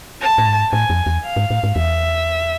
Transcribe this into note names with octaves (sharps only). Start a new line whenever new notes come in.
A5
A2
G#2
A2 G#5
F2
E2
F5
G#2
A2
G#2
E2 E5